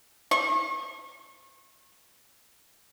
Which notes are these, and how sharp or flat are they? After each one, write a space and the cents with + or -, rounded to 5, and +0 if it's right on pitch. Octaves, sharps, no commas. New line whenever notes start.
C#6 -40